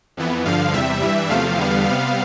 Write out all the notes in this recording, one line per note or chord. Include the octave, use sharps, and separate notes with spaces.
F2 E3 B3
G2 D3 F3 F5
E2 C3 G3 E5
G2 E3 G3
E2 C3 F3 A3 F5
E2 D3 G3 B3
C3 G3 B3 F5